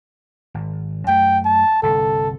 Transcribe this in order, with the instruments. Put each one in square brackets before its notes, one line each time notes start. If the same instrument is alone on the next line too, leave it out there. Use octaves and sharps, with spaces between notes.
[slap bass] G#1
[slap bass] F#2 A3 [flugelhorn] G5
[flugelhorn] A5
[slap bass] G1 C2 [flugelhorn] A4